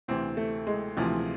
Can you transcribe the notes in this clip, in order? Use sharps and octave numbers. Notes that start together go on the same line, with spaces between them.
D2 C3 E3 C4
A3
G#3
D2 C3 E3 F3